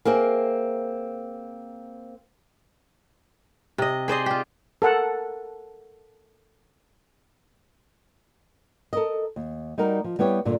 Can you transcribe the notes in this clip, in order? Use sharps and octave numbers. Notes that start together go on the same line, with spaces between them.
A#3 C4 G#4 E5
C3 D#5
G#4 C5 D5 D#5
F4 G4
A4 A#4 F#5
A4 A#4 D#5
D#2
G3 D#4 F#4 A#4
F3
G3 B3 E4 G4 C#5
G2 A#2 D3